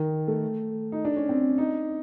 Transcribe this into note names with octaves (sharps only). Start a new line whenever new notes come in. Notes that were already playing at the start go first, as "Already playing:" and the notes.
Already playing: D#3
A3
D#4
D4
C#4
C4
D#4